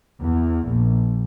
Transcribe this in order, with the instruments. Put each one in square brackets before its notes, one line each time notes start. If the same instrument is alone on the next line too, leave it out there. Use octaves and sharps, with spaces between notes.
[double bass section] E2
A#1